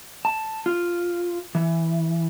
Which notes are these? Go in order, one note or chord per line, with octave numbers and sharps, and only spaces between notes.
A5
F4
E3